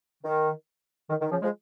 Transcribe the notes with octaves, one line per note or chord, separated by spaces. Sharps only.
D#3
D#3
D#3
C#3 F3
F3 G#3